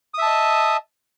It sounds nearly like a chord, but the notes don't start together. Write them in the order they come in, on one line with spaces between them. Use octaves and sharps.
D#6 E5 A5 D#5